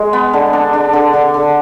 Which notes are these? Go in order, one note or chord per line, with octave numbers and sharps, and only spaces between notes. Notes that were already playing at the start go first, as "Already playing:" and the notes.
Already playing: G#3
B3
D3
D4
D4
D3
D3
D3